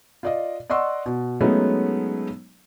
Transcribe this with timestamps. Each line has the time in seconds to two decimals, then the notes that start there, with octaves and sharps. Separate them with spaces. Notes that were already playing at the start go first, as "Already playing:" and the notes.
0.23 F4 D5 D#5
0.70 D5 D#5 F#5 C6 C#6 E6
1.06 B2
1.41 F#3 G#3 A3 B3 C#4 D#4